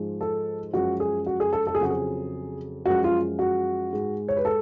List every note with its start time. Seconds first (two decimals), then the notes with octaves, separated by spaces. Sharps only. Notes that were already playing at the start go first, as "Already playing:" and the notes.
Already playing: G#2 F3 G#3
0.21 A4
0.73 F#2 F3 G#3 F#4
1.00 G#4
1.26 F#4
1.40 G#4
1.53 A4
1.67 A4
1.75 G#4
1.80 F2 C#3 F#3 F#4
1.90 G#4
2.85 F#2 F3 G#3 F#4
3.04 F4
3.39 F#4
3.92 G#2 G#3
4.28 C#5
4.36 B4
4.45 A4